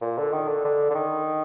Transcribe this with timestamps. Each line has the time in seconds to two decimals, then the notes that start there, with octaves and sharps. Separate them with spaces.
0.02 A#2
0.18 D3
0.33 D#3
0.48 D3
0.65 D3
0.90 D3
0.95 D#3